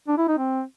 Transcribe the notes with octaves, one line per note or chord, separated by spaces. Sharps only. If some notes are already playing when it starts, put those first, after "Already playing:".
D4
E4
D#4
C4